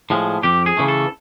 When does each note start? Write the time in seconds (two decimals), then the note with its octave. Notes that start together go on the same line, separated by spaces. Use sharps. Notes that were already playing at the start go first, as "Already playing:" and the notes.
0.10 A2 F3 G#3
0.43 F2 G4
0.66 G#4
0.77 C#3 E3 A3
0.88 A4